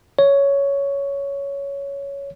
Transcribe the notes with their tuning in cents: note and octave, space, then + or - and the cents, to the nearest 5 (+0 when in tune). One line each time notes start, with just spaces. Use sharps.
C#5 +10